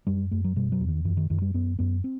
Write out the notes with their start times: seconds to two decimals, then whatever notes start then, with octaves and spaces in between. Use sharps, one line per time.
0.07 F#2 G3
0.31 F#2 A3
0.44 F#3
0.56 B2 G3
0.72 F#3
0.81 E2
0.88 D#3
1.05 F#2 E3
1.17 D#3
1.30 F#2 D#3
1.42 G3
1.54 F#2 B3
1.79 F#2 B3
2.04 C4